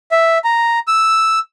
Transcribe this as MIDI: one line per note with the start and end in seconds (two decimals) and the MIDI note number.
0.11 0.38 76
0.44 0.79 82
0.88 1.39 88